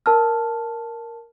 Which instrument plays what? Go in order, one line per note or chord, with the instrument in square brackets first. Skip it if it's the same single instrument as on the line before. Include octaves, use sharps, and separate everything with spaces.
[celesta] A#4 A5 F6